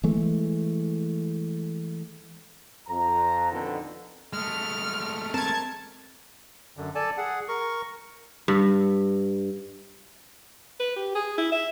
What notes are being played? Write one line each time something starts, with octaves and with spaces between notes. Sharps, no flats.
E3 G#3 A3
F2 A#5
F2 B2 D3 D#3
G#3 A3 F6
C4 A#4 A5 G#6
F#2 D3
A4 D5 G#5 A5
G#4 F#5
A#4 C#6
G2
B4
G4
G#4
E4
E5